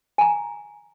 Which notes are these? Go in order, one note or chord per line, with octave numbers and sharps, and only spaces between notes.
G#5 A#5